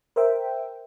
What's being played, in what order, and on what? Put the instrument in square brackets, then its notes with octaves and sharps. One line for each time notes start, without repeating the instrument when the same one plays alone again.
[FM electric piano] A#4 C5 E5 G5